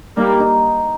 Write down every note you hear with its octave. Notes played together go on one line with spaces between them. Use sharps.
G3 A#3 D#4
D#4